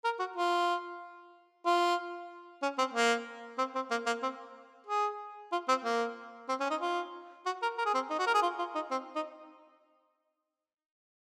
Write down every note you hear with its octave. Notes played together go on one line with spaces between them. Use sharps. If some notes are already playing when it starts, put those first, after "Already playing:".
A#4
F#4
F4
F4
C#4
C4
A#3
C4
C4
A#3
A#3
C4
G#4
F4
C4
A#3
C4
C#4
D#4
F4
F#4
A#4
A#4
G#4
C4
D#4
F#4
A#4
G#4
F4
F4
D#4
C4
D#4